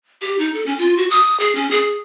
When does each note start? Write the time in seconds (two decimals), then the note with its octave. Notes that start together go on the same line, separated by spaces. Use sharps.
0.21 G4
0.39 D#4
0.54 A4
0.66 C#4
0.78 F4
0.97 F#4
1.10 D#6
1.40 G#4
1.55 C#4
1.71 G#4